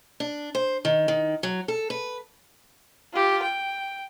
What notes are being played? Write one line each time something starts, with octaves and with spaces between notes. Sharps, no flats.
D4
C5
D#3
D#3
F#3
A4
B4
F4 G4
G5